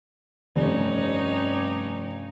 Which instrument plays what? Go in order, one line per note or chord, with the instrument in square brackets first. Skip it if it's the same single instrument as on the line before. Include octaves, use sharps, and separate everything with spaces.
[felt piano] F1 [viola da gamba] G2 C#4 D#4